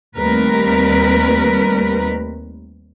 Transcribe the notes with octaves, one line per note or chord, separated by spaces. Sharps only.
D#2 G3 A3 C4 A#4 B4